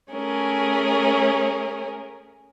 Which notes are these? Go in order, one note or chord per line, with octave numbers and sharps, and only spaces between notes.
A3 C#4 G#4 A#4